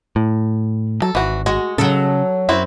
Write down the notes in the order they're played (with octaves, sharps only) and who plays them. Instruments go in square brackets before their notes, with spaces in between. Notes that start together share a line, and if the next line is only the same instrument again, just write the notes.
[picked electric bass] A2
[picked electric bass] F#3 [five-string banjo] A4
[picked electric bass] G#1 [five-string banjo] E3 F#4
[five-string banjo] G#3 [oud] F#4
[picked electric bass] C#3 [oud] F#3 A4
[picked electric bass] F#2 [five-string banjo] C4 E4 F#4